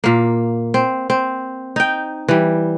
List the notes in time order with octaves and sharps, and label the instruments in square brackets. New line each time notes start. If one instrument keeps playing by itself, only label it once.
[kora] A#2 A#3
C4
C4
D#4 G5
E3 G3